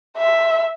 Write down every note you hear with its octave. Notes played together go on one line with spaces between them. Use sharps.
E5